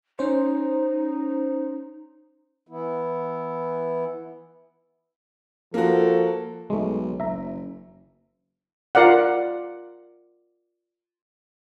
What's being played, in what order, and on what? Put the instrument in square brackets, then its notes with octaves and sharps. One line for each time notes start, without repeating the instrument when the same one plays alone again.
[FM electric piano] C#4 C5 [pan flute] D#4
[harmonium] E3 B3 E4
[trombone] F3 [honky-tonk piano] A#3 F#4 [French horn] A4
[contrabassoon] B1 [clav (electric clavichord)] G#3 A3
[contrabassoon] F#1 [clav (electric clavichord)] E5 A#5
[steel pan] F4 A#4 D5 F5 F#5